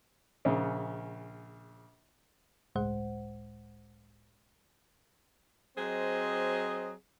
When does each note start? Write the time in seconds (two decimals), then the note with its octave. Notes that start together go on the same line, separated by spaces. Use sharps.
0.45 A#1 C#3
2.75 G1 C#2 A2 G#3 C5 F#5
5.77 F#3 C4 G#4 C5 D#5